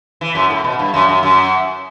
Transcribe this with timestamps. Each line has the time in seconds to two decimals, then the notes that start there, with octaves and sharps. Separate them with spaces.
0.21 E3
0.35 F#2
0.50 A2
0.64 B2
0.79 G2
0.94 F#2
1.09 F#2
1.23 F#2